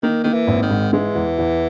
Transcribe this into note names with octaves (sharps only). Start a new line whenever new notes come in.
D#3 A#3
D#3 A#3
E3
G#1
D#3
G#2
E3 G#3
E2
E2